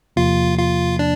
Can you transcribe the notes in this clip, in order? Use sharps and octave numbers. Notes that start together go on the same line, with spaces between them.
E2 C3 F3 A#3 F4
F4
D4